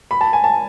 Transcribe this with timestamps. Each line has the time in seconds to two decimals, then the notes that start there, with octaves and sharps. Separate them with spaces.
0.11 B5
0.21 A5
0.33 G#5
0.44 A5